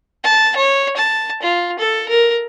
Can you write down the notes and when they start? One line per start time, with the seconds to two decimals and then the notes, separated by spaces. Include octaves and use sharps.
0.24 A5
0.57 C#5
0.97 A5
1.43 F4
1.79 A4
2.09 A#4